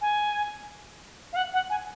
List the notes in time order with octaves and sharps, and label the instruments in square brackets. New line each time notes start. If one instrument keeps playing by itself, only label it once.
[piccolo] G#5
F5
F#5
F#5
G#5